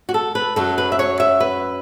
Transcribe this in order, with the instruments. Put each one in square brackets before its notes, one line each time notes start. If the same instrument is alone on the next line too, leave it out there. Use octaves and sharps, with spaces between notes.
[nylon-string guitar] F#4
A4
B4
F#2 F#3 A4
B4
E5
C#5
E5
B4